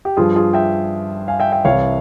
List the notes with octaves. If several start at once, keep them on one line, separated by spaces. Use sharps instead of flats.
G4
G2 F3 F4 G#4
F4 G#4
E5 G5
F5 G#5
E5 G5
E5 G5
C2 C3 E3 C#5 F5